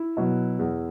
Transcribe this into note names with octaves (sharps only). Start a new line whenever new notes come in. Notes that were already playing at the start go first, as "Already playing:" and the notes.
Already playing: E4
B2 F#3
E2